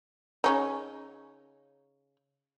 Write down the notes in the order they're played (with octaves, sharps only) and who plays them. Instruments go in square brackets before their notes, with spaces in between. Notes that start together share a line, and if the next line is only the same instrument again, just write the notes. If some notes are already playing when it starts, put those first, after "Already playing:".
[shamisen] C#3 C#4 D#4